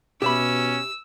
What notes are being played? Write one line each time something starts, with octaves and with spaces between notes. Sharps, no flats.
B2 C#4 G4 E5 B5 E6